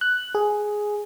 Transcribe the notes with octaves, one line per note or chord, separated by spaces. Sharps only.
F#6
G#4